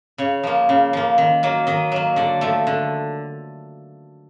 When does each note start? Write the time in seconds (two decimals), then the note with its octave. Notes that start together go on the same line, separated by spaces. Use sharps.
0.18 C#3 C#5
0.43 F3 A#3
0.69 C#3
0.93 F3 A#3
1.18 D#3
1.43 F#3 A#3
1.67 D#3 D#5
1.92 F#3 A#3
2.16 D3 D5
2.41 F3 A3
2.67 D3